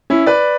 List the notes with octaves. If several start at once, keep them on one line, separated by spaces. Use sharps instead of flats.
C#4 E4
B4 D5